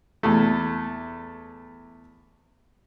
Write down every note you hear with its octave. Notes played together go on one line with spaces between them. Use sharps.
E2 A3